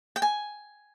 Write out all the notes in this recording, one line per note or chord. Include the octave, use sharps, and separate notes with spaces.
G5
G#5